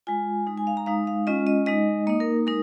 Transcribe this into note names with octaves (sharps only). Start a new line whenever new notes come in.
G#3 F4 G#5
G#3 D#4
G#5
F5
A#5
G#3 D#4 F5
F5
G#3 C#4 F4 D#5
D#5
G#3 D#4 D#5
A#3 D#4 D#5
A#4
G#3 D#4 A#4